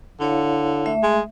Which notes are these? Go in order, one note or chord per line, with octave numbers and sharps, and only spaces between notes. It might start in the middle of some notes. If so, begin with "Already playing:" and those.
D3 E4 C#5 F5
A3 E5
G#3